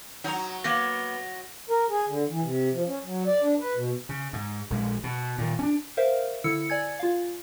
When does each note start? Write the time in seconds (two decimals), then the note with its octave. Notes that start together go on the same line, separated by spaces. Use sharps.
0.24 F#3 D#4 A#5
0.64 A#3 B3 A#6
1.69 A#4
1.90 G#4
2.08 D3
2.28 E3
2.42 C3
2.73 F3
2.87 C#4
3.03 F#3
3.26 D5
3.42 D4
3.59 B4
3.75 B2
4.09 C#3
4.33 G#2
4.70 A#1 G#3
5.04 B2
5.38 A#2 D#3
5.59 C#4 D4
5.97 A#4 C5 E5 F5
6.44 D3 E4 E6 C#7
6.70 D5 G#5 G#6
6.99 F4 F5